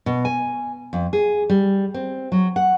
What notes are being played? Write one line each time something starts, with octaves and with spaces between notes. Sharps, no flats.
B2
G#5
F2
G#4
G3
C4
F#3
F#5